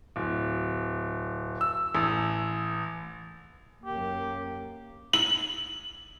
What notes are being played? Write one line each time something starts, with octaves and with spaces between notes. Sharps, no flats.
D1
E6
A1
F#2 A#3 G4
F#7